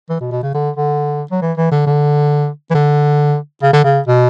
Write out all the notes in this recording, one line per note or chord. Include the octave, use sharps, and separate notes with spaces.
E3
B2
B2
C#3
D3
D3
F#3
E3
E3
D3
D3
E3
D3
C#3
D3
C#3
B2